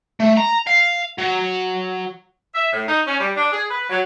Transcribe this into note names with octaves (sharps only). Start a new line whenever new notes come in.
A3
A#5
F5
F#3
E5
A2
D#4
C#4
G3
D4
G#4
B4
F#3